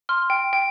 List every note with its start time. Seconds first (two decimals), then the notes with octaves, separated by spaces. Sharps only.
0.09 C6 F6
0.30 G5
0.53 G5